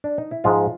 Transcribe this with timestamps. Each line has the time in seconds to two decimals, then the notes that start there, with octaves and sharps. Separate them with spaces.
0.04 D4
0.18 D#4
0.31 E4
0.44 G#2 F3 G#3 F4